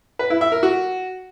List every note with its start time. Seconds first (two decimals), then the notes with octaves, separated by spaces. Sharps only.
0.19 B4
0.30 E4
0.41 E5
0.52 A#4
0.63 F#4